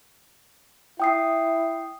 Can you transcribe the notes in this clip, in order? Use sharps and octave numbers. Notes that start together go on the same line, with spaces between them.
E4 G5 D#6 C7